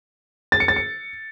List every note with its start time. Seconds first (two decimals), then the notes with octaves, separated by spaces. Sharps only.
0.52 A6
0.60 C#7
0.68 A6
0.76 C#7